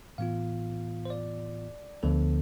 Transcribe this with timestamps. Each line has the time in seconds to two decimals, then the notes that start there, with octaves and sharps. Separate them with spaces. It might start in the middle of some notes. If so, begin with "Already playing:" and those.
0.18 A2 E3 B3 F4 F5
1.05 C5
1.10 D5
2.03 D2 D3 F3 B3 A4